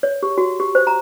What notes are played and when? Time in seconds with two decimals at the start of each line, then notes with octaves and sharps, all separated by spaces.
0.03 C#5
0.23 G4
0.38 F#4
0.60 G4
0.75 C5
0.87 A#5